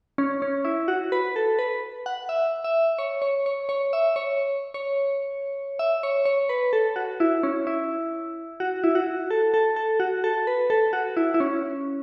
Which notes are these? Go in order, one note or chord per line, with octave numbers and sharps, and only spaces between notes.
C#4
C#4
E4
F#4
B4
A4
B4
F#5
E5
E5
C#5
C#5
C#5
C#5
E5
C#5
C#5
E5
C#5
C#5
B4
A4
F#4
E4
C#4
E4
F#4
E4
F#4
A4
A4
A4
F#4
A4
B4
A4
F#4
E4
E4
C#4